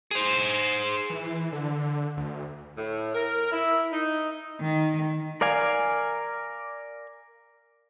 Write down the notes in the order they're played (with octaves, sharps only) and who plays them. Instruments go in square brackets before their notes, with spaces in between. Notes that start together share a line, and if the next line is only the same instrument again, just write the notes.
[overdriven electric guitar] G#4 C5
[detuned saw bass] E3
D3
D2
[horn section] A2
A#4
E4
D#4
[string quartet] D#3
[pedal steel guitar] A#4 D5 F5 G#5